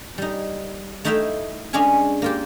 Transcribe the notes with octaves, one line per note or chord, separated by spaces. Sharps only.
G3 D#4
A3 D#4 E4 E5 F5 G5
G#3 C#4 D4 G#4 F5 G#5
A#3 F4 G4